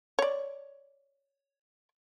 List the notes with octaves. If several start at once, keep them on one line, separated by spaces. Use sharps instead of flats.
C#5 D5